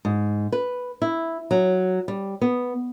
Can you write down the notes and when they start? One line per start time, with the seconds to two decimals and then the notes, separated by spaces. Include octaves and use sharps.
0.05 G#2
0.52 B4
1.02 E4
1.51 F#3
2.08 G3
2.41 B3